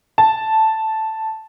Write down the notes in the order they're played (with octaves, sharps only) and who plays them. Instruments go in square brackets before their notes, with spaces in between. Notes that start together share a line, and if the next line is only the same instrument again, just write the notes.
[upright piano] A5